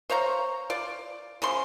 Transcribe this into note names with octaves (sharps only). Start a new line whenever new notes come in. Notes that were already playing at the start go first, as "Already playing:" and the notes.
C5 C#5 F5 A#5
F4 D5
C#3 F3 C6